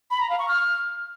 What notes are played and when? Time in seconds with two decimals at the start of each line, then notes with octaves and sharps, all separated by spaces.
0.11 B5
0.20 A#5
0.30 F5
0.39 C#6
0.48 F6